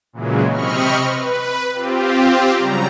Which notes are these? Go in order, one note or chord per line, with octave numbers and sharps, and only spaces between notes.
A#2 C#3 E3 F#3 G#3
C3 C4 D#5 B5 C#6 F6
B4
C4 F4 G4
C#3 F#3 G3 A#5